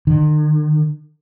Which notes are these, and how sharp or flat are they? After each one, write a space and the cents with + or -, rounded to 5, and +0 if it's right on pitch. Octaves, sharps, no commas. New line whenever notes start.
D#3 -45